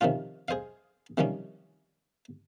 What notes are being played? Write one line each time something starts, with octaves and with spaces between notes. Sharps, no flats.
C3 D#3 F3 C#4 F4
G#4 C5 D#5 F5
C3 D#3 F3 G3 C#4